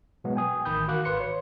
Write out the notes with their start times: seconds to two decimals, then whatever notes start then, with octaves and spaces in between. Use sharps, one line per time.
0.24 B2 F#3 G#3 B3
0.35 G5 G#5 D#6
0.65 A1 D#3 B5 D#6 G6
0.88 F#4 A#4 F5 D6 F#6
1.05 G#1 B4 C6 C#7
1.20 C#5